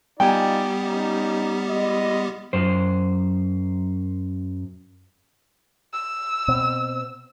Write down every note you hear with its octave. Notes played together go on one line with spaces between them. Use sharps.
G3 B3 D#4 F4 G4 D5 G5 G#5
C#4 D#4
G#3 E4 D#5
F#2 C5
E6
B2 C4